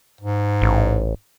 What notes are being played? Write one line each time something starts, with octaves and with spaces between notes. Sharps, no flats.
G#2
A1